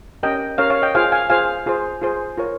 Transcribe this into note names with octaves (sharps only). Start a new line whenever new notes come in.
C#4 G4 A#4 D#5 G5
C#4 G4 A#4 C#5 F5
C#5 F5
D#5 G5
F4 G#4 C5 F5 G#5
F5 G#5
F4 G#4 C5 F5 G#5
F4 G#4 C5
F4 G#4 C5
F4 A#4 C#5